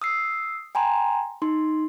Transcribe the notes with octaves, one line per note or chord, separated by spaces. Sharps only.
D#6 E6 C7
G5 G#5 A#5 C6
D#4 C6